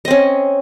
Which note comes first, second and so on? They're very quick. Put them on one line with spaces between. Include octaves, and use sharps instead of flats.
D#5 C4 C#4